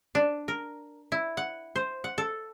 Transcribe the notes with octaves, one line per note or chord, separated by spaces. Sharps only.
D4
A#4
E4
F#5
C5
F#5
A4